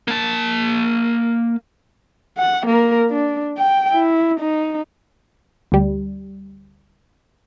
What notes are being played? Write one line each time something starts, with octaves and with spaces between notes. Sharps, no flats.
A#3 A5
F#5
A#3 A#4
D4
G5
E4
D#4
D2 G3